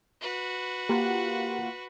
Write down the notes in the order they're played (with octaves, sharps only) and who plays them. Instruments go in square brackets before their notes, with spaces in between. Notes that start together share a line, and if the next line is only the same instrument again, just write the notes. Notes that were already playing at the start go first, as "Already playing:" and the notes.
[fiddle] F#4 B4
[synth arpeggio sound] A#3 F4 F#5 [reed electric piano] G4